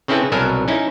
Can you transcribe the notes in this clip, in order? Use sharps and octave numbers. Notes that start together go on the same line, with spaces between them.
C#3 C4 C#4 E4 A4 B4
C2 B2 F#3 A4 A#4 G#5
C#4 D#4 E4